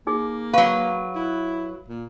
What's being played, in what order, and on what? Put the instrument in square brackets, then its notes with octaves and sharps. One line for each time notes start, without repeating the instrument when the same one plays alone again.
[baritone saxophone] A#3 [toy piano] D#4 G#4
[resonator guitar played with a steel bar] F#3 B4 [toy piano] F5 C#6
[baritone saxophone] E4
A#2